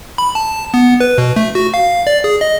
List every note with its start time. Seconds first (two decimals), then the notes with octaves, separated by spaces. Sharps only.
0.18 B5
0.35 A5
0.74 B3
1.00 B4
1.18 B2
1.36 A3
1.55 F#4
1.74 F5
2.07 D5
2.24 G#4
2.41 D#5